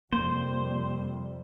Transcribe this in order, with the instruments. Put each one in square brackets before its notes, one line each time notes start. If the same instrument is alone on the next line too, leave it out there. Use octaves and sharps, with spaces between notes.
[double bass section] F2 C3 G3 [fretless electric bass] A#3 [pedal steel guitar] C5